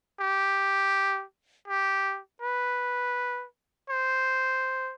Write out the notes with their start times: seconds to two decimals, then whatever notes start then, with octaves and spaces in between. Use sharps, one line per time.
0.20 G4
1.68 G4
2.42 B4
3.90 C5